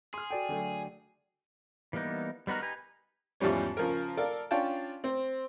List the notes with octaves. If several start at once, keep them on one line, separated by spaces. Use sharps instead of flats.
G#4 C6 F6
F#4 A4 D5 G5
D3 F#3 A3
E3 G3 A#3 B3 D#4
G3 B3 D#4 F#4 A#4
D#4 G4 B4 G#5 A#5
E2 G#2 F3 G3 C#4
C#3 F3 A#4
A4 A#4 D5 F5
C#4 D4 F4 G5 A5
C4